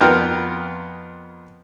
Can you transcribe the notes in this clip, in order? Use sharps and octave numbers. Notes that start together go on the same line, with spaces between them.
F2 B3 F4 A#4 G5 A#5